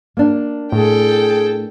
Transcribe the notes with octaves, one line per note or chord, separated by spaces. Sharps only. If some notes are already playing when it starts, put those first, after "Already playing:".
A#3 D4
A2 G#4 A4 G5